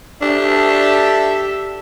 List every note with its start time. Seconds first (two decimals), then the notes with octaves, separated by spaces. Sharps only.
0.21 D4 G4 A4 E5